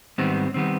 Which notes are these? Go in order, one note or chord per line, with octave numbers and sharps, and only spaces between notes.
G#2 D#3 G3 B3 C4
D#3 G3 B3 C4